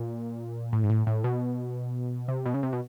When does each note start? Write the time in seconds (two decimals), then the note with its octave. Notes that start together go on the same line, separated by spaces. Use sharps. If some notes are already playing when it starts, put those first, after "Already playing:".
Already playing: A#2
0.73 A2
0.83 G#2
0.90 A2
1.07 A2
1.24 B2
2.28 C3
2.46 B2
2.54 C#3
2.63 C3
2.73 B2